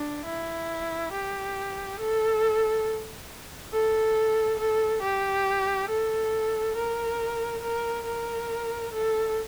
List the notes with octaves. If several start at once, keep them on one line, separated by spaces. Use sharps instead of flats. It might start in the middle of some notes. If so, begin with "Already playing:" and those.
Already playing: D4
E4
G4
A4
A4
A4
G4
A4
A#4
A#4
A#4
A4